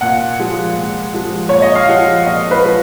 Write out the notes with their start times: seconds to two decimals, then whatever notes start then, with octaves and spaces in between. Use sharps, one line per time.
0.01 A#2 F#5
0.39 F3 G#3
0.76 A#2
1.14 F3 G#3
1.49 A#2 C#5
1.62 D#5
1.75 F5
1.88 F3 G#3 F#5
2.26 A#2 D#5
2.51 B4
2.64 F3 G#3